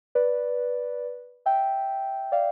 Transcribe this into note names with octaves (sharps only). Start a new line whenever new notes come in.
B4 D5
E5 G5
D5 F5